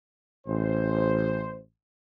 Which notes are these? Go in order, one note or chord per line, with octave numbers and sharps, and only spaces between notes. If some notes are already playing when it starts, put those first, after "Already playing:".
A1 C5